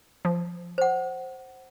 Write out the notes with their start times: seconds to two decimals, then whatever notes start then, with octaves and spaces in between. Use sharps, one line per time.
0.25 F3
0.78 C5 F#5